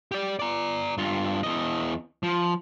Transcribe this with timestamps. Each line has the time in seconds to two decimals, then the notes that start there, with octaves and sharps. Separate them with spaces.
0.12 G4 D5
0.39 D5 A#5
0.98 G2 F4
1.43 E2 D#5
2.23 F3